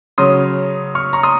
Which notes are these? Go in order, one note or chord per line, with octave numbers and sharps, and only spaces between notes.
C#3 F#3 C#4 C6 D#6
C#6 F6
A#5 C#6
C6 D#6